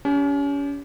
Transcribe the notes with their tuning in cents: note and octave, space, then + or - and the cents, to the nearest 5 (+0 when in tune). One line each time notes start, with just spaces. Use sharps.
C#4 +35 G4 +0